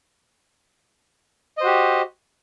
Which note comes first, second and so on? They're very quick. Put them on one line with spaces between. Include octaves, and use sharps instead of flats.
D#5 C5 F#4 G4